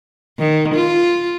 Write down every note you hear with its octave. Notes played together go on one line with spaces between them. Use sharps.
D#3
F4